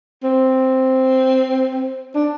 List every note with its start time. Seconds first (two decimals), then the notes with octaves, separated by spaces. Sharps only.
0.24 C4
2.15 D4